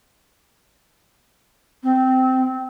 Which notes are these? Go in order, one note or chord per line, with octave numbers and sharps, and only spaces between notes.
C4